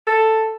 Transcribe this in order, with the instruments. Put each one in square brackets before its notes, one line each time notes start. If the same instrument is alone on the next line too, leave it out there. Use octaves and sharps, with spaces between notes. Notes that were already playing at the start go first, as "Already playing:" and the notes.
[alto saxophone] A4